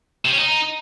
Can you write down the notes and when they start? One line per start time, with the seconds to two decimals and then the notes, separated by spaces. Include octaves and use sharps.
0.25 C3
0.32 C#4
0.39 D#4